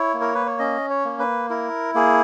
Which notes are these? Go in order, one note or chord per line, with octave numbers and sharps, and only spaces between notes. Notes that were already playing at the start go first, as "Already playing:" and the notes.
Already playing: E4 C#5
A#3
A#4
B4
C#5
C#4 D#5
C#5
A#3
B4
E4 A#4
A#3 G#4